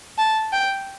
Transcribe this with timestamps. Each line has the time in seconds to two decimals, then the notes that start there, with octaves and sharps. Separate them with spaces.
0.18 A5
0.53 G5